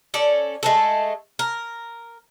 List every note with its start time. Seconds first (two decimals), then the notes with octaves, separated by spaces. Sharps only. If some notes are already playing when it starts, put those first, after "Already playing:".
0.14 C#4 A4 D5
0.63 G#3 A3 A4
1.39 A#4